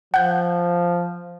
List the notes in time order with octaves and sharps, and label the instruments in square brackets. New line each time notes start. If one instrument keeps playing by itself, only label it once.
[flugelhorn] F3 [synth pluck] F#5 G6